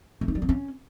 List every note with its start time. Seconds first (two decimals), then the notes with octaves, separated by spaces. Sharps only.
0.21 A3
0.28 D#4
0.35 G3
0.42 C4
0.49 C#4